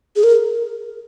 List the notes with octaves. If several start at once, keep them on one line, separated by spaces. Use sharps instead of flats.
G#4
A#4